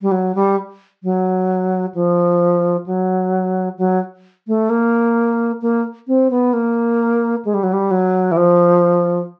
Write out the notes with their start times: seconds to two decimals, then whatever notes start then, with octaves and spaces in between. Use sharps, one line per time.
0.02 G3
0.11 F#3
0.35 G3
1.03 F#3
1.95 F3
2.86 F#3
3.78 F#3
4.47 A3
4.70 A#3
5.62 A#3
6.07 C4
6.31 B3
6.53 A#3
7.45 G#3
7.54 G3
7.63 F#3
7.73 G3
7.91 F#3
8.32 E3
8.37 F3